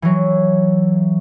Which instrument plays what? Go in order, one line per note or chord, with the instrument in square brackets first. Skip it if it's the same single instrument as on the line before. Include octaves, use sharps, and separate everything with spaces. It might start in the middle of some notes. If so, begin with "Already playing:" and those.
[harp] E3 F#3